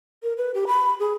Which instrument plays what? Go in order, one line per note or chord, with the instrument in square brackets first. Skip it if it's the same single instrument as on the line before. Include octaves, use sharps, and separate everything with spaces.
[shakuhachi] A#4
B4
G4
B5
G#4